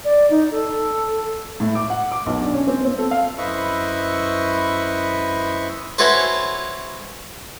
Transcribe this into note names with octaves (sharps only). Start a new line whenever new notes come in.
D5
D#4
A4
A2
D6
F#5
D6
B1
D4
C#4
C4
C4
A4
F5
F#2 E4 B4 C5 D#5 C#6
C#4 E4 F#4 A4 B4 C5